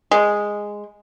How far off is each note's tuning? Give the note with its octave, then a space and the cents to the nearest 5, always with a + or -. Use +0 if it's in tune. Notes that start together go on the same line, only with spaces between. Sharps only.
G#3 -5